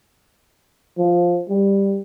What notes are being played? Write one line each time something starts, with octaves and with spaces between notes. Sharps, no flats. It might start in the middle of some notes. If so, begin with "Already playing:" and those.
F3
G3